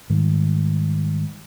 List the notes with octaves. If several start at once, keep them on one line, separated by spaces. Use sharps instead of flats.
G#2 D#3 G3